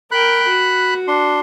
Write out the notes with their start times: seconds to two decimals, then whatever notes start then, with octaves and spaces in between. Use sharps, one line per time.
0.11 A#4 G5 B5 F#6
0.48 F#4
1.08 D4 C6